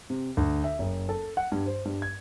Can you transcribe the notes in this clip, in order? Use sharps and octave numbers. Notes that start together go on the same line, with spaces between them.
C3
D2
E5
F#1
A4
F#5
G2
C5
G2
G#6